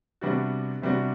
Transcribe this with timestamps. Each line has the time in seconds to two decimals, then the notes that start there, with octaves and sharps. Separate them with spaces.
0.21 C3 G3 B3 D4 F#4
0.82 C3 G3 B3 D4 F#4